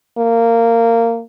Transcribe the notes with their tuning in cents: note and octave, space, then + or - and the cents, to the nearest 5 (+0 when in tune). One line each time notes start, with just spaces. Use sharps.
A#3 -15